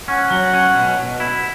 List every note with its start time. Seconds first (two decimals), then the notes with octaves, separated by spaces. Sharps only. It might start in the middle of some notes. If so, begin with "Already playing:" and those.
0.08 C#4 F#5
0.30 F#3
0.53 C#4
0.75 B2
0.98 B2
1.20 E4